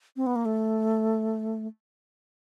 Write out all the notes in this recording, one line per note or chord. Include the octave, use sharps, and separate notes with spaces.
C4
B3
A#3
A3